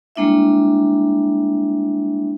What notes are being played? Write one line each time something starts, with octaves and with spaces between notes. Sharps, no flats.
G3 G#3 A#3 D4 E4 E5